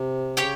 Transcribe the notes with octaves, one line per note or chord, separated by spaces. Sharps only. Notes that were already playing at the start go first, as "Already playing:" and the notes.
Already playing: C3
C#3 G4 C#5 G5